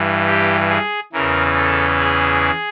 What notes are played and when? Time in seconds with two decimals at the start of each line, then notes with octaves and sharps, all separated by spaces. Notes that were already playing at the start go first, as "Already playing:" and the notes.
Already playing: G2 E3
0.27 G4
0.70 G#4
1.13 E2 C#3 E3 A#4
1.56 A4
1.99 G#4